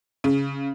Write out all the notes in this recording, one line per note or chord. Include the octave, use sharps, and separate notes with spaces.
C#3